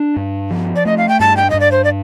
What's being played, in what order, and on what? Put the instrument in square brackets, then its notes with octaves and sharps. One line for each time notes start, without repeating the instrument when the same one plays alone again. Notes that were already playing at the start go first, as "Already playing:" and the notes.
Already playing: [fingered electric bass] D4
G2
F3
[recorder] D5
[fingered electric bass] A3 [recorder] D#5
[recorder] F5
G5
[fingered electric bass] G2 [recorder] A5
[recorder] G5
[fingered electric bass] G2 [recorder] D#5
[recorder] D5
C5
D5